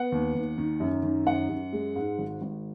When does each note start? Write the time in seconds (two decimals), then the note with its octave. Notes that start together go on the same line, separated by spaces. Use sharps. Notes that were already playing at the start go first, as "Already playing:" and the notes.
Already playing: B3 F#5
0.12 D#2
0.35 D#2
0.58 D#3
0.80 F#2
1.03 D#3
1.27 F#2 F#5
1.49 F#2
1.73 G#3
1.96 G#2
2.19 G#1
2.41 G#1